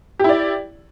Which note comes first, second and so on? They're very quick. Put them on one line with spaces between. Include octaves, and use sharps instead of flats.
G4 E4 D5